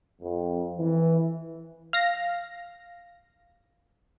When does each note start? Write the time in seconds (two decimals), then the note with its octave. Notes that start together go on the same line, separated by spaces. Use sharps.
0.21 F2
0.79 E3
1.93 F5 A#6